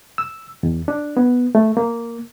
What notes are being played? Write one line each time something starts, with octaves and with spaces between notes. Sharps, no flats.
E6
E2
D4
B3
A3
A#3